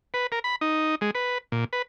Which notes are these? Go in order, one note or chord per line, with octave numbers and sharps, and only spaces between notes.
B4
A#4
B5
D#4
G#3
B4
A#2
B4